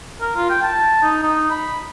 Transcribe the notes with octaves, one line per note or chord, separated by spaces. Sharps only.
A#4
F4
G5
A5
D#4
D#4
B5